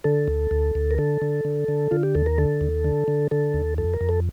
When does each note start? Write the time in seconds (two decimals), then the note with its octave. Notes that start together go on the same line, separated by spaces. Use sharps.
0.04 D3 A4
0.28 D2
0.51 D2
0.75 D2
0.91 A#4
0.98 D3 A4
1.22 D3
1.45 D3
1.68 D3
1.91 D3 F4
2.03 G4
2.15 D#2 A4
2.26 A#4
2.38 D3 A4
2.61 D#2
2.84 D3
3.08 D3
3.31 D3 A4
3.54 D#2
3.78 F2 A4
3.94 A#4
4.01 F2
4.09 A4